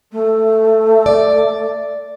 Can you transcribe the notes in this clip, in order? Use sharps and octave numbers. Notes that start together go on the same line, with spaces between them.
A3
D5